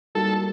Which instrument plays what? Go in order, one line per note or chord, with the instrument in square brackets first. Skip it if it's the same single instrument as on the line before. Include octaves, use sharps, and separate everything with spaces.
[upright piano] G3 A#3 D#4 F#4 [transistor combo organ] A4